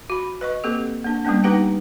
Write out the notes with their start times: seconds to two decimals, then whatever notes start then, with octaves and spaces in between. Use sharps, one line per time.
0.10 F#4 B5
0.41 B4 D#5 C#6
0.64 A#3 C4 G4 A4
1.04 A#3 D4
1.25 G3 A#3 B3 C#4 D4
1.44 D#4 G4 B4 F#5 G5